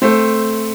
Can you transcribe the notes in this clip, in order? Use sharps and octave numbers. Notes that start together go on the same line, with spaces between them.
A3 C4